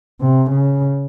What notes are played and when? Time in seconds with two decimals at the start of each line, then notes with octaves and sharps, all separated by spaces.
0.21 C3
0.50 C#3